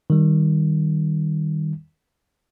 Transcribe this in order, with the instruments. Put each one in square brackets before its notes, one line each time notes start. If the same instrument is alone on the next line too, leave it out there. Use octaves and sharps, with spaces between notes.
[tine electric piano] D#3 G3